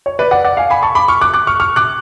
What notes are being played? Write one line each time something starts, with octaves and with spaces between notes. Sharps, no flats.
C#5
B4 D5
D5 F#5
D5 F#5
F5 G#5
G#5 B5
A5 C#6
B5 D6
C#6 F6
D6 F#6
D6 F#6
C#6 F6
C#6 F6
D6 F#6